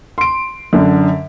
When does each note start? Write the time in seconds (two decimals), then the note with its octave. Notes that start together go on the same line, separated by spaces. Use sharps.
0.18 C6 D7
0.73 F#2 D3